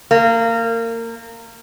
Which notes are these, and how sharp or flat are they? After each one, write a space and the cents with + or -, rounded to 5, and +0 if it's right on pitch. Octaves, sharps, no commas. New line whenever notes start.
A#3 -25